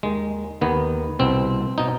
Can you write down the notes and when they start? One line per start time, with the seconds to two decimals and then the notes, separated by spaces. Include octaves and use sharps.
0.03 D#2 D#3 G#3
0.61 D#2 D#3 B3
1.19 C2 B2 C4
1.78 B2 D#4